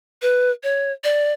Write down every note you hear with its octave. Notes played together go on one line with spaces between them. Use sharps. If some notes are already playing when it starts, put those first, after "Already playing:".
B4
C#5
D5